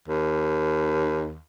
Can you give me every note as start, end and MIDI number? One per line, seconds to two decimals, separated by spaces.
0.08 1.38 39